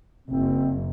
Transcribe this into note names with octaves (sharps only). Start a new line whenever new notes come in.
F#1 C4